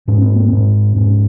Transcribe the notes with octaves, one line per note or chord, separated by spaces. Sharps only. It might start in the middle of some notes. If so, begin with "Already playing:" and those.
G#2 C#4
C4
A#3
G#2 C4
G#2 C#4